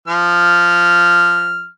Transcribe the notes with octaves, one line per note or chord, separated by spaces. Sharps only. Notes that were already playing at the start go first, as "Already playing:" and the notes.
F3 F6